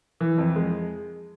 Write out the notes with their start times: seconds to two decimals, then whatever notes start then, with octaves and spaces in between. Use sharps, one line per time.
0.21 E3
0.38 F2
0.56 G#3